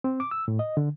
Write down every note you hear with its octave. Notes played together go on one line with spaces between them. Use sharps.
C4
D6
E6
A2
D#5
D3